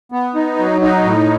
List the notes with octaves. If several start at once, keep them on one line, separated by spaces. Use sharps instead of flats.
B3
D#4
F#3
D#4
A2